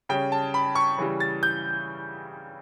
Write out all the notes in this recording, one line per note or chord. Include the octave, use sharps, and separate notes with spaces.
C#3 G3 C#4 G5
A5
B5
C#6
C#3 E3 G3
A6
G6